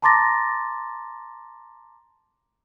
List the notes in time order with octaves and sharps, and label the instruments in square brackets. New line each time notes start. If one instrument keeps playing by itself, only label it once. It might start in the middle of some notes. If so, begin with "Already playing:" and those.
[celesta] A5 A#5 C6 D6 A6 A#6